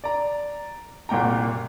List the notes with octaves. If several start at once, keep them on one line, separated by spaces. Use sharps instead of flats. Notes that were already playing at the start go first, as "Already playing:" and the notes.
D5 A#5
F#1 C2 A#2 G5 A#5